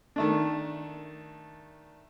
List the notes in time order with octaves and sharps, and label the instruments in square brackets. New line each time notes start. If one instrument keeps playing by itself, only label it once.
[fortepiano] D#3 A3 D4